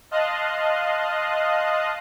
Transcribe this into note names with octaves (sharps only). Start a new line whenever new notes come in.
D#5 F5 A5 C6 D#6 F#6